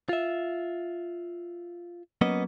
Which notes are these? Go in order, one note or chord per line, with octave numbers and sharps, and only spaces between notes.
F4 E5
F#3 A#3 B3 C#4 D#5